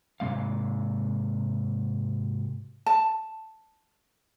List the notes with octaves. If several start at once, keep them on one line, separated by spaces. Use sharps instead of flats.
G#2 C3 G#3 F5
A5